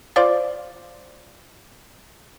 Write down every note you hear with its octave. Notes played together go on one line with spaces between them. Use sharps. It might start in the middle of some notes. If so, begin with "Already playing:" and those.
F4 C5 D5